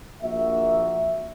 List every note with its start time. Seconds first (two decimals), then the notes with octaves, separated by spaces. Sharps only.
0.22 A#1 A#3 F#4 E5